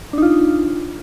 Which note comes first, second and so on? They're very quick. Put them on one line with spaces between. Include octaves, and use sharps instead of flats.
D4 D#4 F4